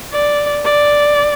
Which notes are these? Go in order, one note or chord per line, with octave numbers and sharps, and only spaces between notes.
D5
D5